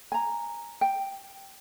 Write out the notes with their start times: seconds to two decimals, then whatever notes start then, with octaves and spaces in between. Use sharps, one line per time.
0.12 G#5 A#5
0.81 G5